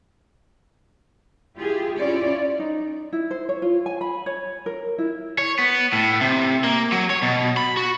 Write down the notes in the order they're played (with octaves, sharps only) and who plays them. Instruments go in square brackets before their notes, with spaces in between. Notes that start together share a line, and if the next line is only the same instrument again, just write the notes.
[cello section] E4 F4 G4 G#4
C#4 E4 F4 C#5 D5
[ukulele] D#4
E4
C5
C#5
F4
G#5
B5
C#5
A#4
E4
[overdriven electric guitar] C#5
B3
A2
C3
A#3
F#3
C#5
B2
B5
F#4